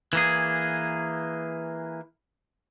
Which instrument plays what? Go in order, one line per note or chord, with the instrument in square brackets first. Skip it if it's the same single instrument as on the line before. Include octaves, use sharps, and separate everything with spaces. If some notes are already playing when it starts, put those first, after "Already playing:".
[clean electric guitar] E3 A#3 G#4